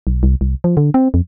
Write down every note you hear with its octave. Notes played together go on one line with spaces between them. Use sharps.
B1
C2
C2
F3
D3
C4
F2